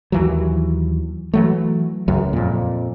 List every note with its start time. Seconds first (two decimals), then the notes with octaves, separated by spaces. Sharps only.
0.12 D#2 E3 F#3
1.34 E3 F#3 A3
2.08 C#2 F#2
2.33 F2 A#2